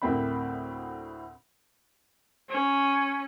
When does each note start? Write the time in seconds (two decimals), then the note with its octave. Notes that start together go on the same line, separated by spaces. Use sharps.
0.02 D2 A2 A#3 C4 E4 B5
2.50 C#4